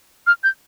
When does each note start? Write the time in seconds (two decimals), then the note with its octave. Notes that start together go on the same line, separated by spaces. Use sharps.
0.27 F6
0.44 G6